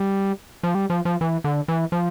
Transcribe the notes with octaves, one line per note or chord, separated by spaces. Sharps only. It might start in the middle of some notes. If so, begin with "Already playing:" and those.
Already playing: G3
F3
G3
F3
F3
E3
D3
E3
F3